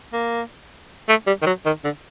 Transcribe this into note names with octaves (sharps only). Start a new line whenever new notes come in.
A#3
A3
G3
D#3
F#3
D#3
D3